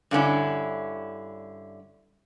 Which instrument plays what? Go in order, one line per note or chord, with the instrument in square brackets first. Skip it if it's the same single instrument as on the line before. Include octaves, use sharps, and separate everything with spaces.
[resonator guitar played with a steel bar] G2 D3 C#4 E4